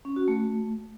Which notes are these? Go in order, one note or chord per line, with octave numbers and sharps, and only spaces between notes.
C#4
F#4
A3